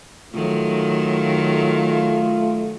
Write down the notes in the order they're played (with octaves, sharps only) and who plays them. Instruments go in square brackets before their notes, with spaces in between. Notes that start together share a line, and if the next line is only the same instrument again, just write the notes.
[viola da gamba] D#3 F#3 [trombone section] A3 F4